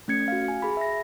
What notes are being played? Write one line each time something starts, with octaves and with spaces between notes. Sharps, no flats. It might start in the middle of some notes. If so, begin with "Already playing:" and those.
A3 C#4 G#6 C#7
F#4 F5
G#5
G#4 B5
E5 A#6